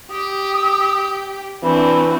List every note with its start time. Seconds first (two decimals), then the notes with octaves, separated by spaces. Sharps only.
0.10 G4 D#6
1.63 E3 C4 D4 F#4 B5